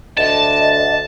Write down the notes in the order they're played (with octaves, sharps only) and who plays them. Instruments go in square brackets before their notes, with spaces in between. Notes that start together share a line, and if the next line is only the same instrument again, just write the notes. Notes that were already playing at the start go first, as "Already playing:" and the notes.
[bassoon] D2 [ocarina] D#5 [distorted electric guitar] A5